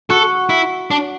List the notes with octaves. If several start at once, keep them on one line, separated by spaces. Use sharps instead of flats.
F#4 A4
E4
D4